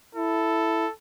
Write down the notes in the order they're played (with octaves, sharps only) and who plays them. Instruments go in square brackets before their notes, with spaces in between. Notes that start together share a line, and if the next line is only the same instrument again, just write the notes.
[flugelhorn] E4 [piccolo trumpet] A4